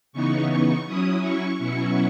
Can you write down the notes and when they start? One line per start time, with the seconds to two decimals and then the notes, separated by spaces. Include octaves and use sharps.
0.13 C#3 E3 B3 D#4 C#6
0.49 C#6
0.86 F#3 C#4 E4 D#6
1.22 C#6
1.58 B2 F#3 C#4 E4 C#6